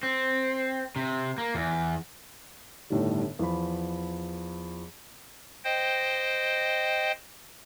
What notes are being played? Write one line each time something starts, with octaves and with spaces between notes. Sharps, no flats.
C4
C3
A#3
E2
G1 A2 D3 D#3 G3
E2 F3 B5
C5 D#5 G5